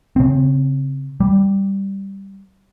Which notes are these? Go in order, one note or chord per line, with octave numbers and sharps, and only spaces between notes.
C#3 C4
G3